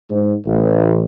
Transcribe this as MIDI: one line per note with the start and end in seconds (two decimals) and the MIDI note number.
0.10 0.33 44
0.46 1.04 33